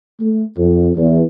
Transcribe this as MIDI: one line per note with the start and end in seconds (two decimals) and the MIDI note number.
0.20 0.45 57
0.57 0.89 41
0.96 1.23 40